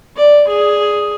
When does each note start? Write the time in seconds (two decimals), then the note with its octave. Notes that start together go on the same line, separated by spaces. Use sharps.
0.16 D5
0.47 G#4